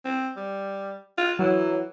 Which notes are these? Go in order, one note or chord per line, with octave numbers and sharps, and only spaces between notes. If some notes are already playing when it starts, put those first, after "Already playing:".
C4
G3
F4
E3 F#3